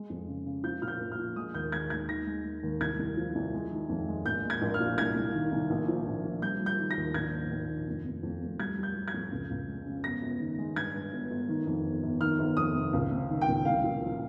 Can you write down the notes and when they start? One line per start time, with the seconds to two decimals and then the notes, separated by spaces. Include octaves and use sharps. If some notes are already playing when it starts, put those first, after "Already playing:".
Already playing: G#3
0.10 F2
0.27 C#3
0.46 C#3
0.64 F3 G6
0.82 A#2 F6
0.88 G6
1.00 A#1
1.12 F6
1.19 F3
1.36 G#3 D#6
1.54 D#2 G6
1.72 G#3 G#6
1.90 D#2 G#6
2.09 D#3 A#6
2.27 G#3
2.45 G#3
2.63 D#2
2.81 C2 G#6
2.99 C2
3.17 F3
3.35 C2
3.53 G#3
3.71 D#3
3.89 F2
4.08 G#3
4.25 A#1 G6
4.44 G#3
4.50 G#6
4.62 A#1
4.74 F6
4.80 A#2
4.98 C2 G#6
5.16 C2
5.34 D#3
5.52 C2
5.70 A#1
5.88 F3
6.07 A#1
6.24 F3
6.42 G3 G6
6.61 G3
6.66 G6
6.79 D#3
6.91 A#6
6.97 D#2
7.14 A#1 G#6
7.32 G#2
7.51 A#1
7.69 D#3
7.87 F1
8.05 F1
8.23 F2
8.41 F1
8.59 G3 G#6
8.78 G3
8.83 G6
8.95 G3
9.08 G#6
9.14 F2
9.32 C#2
9.50 C#2
9.68 G#3
9.86 C#3
10.04 G1 A#6
10.22 G1
10.40 D#3
10.58 G#3
10.76 G2 G#6
10.94 G2
11.12 G1
11.30 G1
11.49 D#3
11.67 F2
11.85 G1
12.03 G1
12.21 D#3 F6
12.39 G1
12.57 F2 D#6
12.75 C3
12.93 C#2
13.11 C3
13.29 D#3
13.41 G5
13.48 C#2
13.65 C2 F5
13.84 A#2
14.01 F3